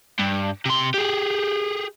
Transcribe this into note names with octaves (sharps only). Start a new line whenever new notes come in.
G2
C3 C6
G4 G#4